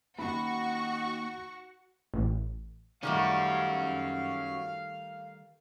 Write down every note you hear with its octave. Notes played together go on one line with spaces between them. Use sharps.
D#3 A#3 C#4 F#4 F#5 B5 C#6
A1
D#3 G3 A3 C#4 F#4 F5